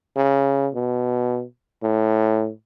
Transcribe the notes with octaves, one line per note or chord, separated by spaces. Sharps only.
C#3
B2
A2